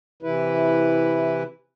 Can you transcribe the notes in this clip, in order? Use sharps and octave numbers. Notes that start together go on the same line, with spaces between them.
C3 E3 E4 B4